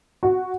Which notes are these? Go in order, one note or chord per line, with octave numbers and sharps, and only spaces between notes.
F#4